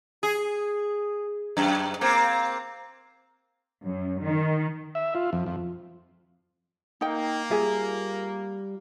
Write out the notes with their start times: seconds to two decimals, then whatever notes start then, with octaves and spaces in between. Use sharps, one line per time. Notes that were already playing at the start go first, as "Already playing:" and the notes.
0.23 G#4
1.57 F#2
2.01 A#3 C4
3.84 F#2
4.23 D#3
4.95 E5
5.15 F4
5.33 F2
5.46 F2
7.01 A#3 D#4 G5
7.51 G3 F4 G#4 E5